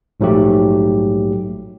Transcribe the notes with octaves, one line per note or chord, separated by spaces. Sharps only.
A#1 G#2 F#3 A3 G4